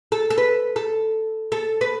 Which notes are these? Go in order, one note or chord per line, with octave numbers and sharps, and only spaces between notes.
A4
A4
B4
A4
A4
B4